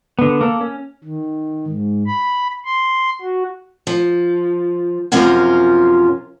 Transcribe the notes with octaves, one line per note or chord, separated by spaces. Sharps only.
D3 B3
A#3 A4
C#4
D#3
G#2
B5
C6
F#4
F3
F#2 C3 F3 C#4 F4 A#4